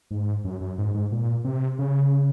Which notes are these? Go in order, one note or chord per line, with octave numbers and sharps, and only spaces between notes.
G#2
F#2
F#2
G#2
G#2
A#2
C3
C#3